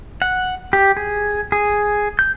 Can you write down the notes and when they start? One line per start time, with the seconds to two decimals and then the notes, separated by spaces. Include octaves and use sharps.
0.22 F#5
0.73 G4
0.97 G#4
1.52 G#4
2.19 G6